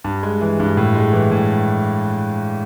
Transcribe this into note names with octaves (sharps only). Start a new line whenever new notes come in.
G2
G#3
E3
G2
A2
G#3
E3
A2